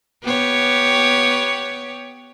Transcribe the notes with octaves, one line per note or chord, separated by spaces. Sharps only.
B3 G4 C#5